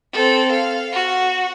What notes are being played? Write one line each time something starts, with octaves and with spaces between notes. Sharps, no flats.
C4 A4
F5
F#4